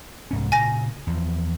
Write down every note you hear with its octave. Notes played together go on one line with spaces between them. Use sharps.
C2 G#2 C#4
A#2 C#3 G#5 A#6
E2 F3